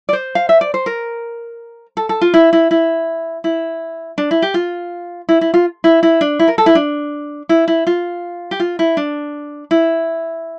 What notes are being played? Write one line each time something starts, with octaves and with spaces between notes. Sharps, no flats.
D5
C5
F5
E5
D5
C5
A#4
A4
A4
F4
E4
E4
E4
E4
D4
E4
G4
F4
E4
E4
F4
E4
E4
D4
E4
A#4
A4
E4
D4
E4
E4
F4
G4
F4
E4
D4
E4